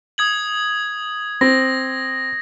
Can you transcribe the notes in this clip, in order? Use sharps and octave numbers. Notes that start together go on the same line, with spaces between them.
D#6 G#6 F#7
C4 A#6